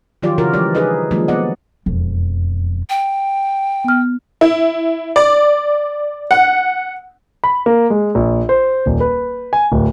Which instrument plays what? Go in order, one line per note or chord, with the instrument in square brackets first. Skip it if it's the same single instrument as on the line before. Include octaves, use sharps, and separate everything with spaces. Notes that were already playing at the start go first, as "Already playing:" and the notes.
[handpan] D#3 F3 F#3 F4 G4 D5
C#3 E3 F4 F#4 A#4
E3 F3 G3 G#3 G4 D5
D4 D#4 G#4 A4 B4 D#5
D#3 F3 F#3 G#3 A#3 D4
F#3 B3 D5 D#5 F#5
[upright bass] E1 F2
[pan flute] G5
[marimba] B3 F6
[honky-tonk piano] E4
D5
F#5
[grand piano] B5
A#3
G#3
A#1
C5
D#1
B4
G#5
D1